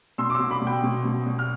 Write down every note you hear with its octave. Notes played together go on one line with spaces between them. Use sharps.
B2 C6 E6
D6
C6 E6
B2
B5 D6
B2
G5 B5
B2
B2
B2
F6